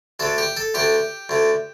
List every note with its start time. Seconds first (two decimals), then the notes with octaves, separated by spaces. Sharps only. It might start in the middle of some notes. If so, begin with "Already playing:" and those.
0.20 D2 D3 A4
0.38 G4
0.57 A4
0.74 D2 D3 G4
1.29 D2 D3